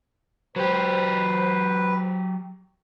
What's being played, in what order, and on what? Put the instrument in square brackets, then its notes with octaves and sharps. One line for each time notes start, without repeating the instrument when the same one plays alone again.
[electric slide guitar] F#3 G4 [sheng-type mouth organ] B4 [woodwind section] C5